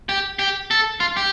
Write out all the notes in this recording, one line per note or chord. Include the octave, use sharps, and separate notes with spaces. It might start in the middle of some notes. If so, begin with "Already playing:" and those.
G4
G4
A4
F4
G4